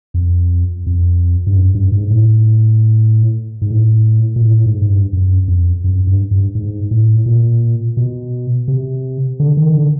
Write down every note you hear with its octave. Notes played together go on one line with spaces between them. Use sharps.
F2
F2
G2
F#2
G2
G#2
A2
G#2
A2
A#2
A2
G#2
G#2
G2
F#2
F2
F#2
G2
G2
G#2
A2
A#2
B2
C3
D3
D#3
D3